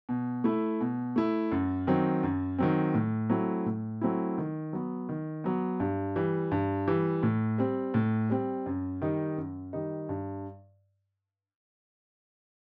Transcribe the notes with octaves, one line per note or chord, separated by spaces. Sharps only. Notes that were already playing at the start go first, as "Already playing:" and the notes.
B2
A3 E4
B2
A3 E4
F#2
D#3 F#3 C4
F#2
D#3 F#3 C4
A2
F#3 A3 C4 E4
A2
F#3 A3 C4 E4
D#3
F#3 B3
D#3
F#3 B3
G2
E3 G3
G2
E3 G3
A2
G3 C4
A2
G3 C4
F#2
D#3 G3 D#4
F#2
D#3 G3 D#4
G2